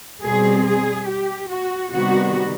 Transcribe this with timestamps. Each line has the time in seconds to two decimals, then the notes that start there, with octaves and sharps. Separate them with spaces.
0.23 B2 G3 C4 G#4
0.66 G#4
1.07 G4
1.50 F#4
1.92 C3 D#3 G3 B3 F#4